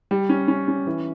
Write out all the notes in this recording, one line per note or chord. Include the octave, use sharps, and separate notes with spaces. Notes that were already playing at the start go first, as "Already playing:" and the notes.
G3
C#4
C#4
C#4
E3